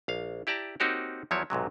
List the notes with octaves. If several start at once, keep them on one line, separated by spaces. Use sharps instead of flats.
A#1 F5
E4 G4 D5 A5 A#5
A#3 C4 D#4 F#4 G4 C#5
E2 F3 F#3 E4 C#5
B1 G#2 C3 F#3